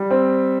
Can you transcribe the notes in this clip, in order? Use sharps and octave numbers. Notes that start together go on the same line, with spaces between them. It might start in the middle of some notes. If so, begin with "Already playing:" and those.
Already playing: G3
C4